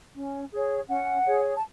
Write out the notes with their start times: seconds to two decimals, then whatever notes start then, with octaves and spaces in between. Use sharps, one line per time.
0.15 C#4
0.51 G#4 C#5
0.88 C#4 F#5
1.25 G#4 C#5
1.56 A5